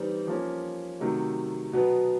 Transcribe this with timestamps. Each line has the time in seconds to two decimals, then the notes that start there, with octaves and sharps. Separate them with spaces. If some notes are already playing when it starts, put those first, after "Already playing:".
Already playing: E3 G3 C4 D#4
0.27 F3 A#3 C#4
1.00 C3 D#3 F#3 A3
1.73 B2 F#3 B3